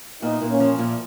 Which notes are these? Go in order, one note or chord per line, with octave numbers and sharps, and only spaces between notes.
A#2 B3 D#4
A#2
A#3 C#4
F3
A#2